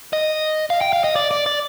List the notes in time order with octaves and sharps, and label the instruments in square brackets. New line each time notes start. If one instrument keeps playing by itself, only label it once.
[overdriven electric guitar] D#5
F5
G5
F5
D#5
D5
D5
D5